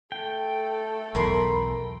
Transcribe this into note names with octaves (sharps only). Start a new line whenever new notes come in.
A3 A4 G5
B1 E2 A#4 B5 C6